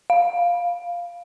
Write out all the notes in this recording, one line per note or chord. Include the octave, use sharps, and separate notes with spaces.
F5